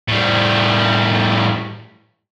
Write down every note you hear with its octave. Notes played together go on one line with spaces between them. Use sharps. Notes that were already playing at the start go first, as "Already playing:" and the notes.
A2 G3